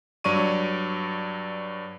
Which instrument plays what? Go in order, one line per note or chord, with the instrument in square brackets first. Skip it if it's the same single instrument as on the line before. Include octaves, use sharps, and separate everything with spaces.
[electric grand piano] G2 F#3 C#5 D5 C#6 D#7